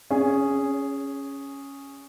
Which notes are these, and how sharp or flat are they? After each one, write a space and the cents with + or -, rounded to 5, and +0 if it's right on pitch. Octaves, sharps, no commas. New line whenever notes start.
C#4 +0 G#4 -5 C#5 +35